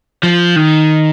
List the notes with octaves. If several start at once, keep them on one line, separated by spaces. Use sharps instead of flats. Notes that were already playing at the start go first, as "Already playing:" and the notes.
F3
D#3